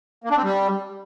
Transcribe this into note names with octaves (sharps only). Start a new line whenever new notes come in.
A#3
D4
C4
G3